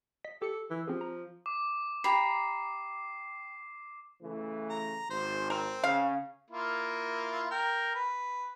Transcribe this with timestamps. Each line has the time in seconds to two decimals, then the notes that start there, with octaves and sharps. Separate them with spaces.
0.24 D#5 B6
0.42 G4 A4 C#7
0.71 E3
0.88 F3 C4 G4 G#4
1.01 A#5
1.46 D6
2.04 G4 A#5 B5 C7
4.22 C#3 E3 A3
4.70 A#5
5.10 G#1 C5
5.50 C4 A#4
5.84 C#3 F5
6.50 A#3 E4 F4
7.51 A#4 G5
7.95 B4